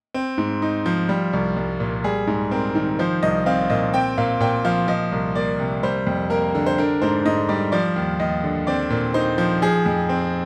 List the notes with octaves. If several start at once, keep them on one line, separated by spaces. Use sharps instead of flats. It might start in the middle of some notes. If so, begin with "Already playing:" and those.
C4
G#2
D#4
F3
G3
C2
C2
A#2
G3 G#4
G#2
C4 A#4
D#3
F3 C5
C2 D#5
C4 F5
A#2 D#5
C4 G5
A#2 F5
A#2 G5
F3 F5
F3 D#5
C2
A#3 D5
C3
G3 C5
F2
A#3 A#4
D3
C5
D4 A#4
G#2 C5
G#2 D#5
G3 D5
F3 D5
D#2
D#2 D#5
D3
C4 D5
A#2
D#4 C5
F3
F3 G#4
F2
C4